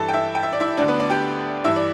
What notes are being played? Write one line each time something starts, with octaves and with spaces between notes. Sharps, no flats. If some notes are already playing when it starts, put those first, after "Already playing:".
Already playing: G2 E3 A4 A5
G5
E4 E5
G5
E5
D5
E4 E5
D2 D3 D4 D5
B3 B4
D4 D5
G4 G5
G2 E3 E4 E5
D5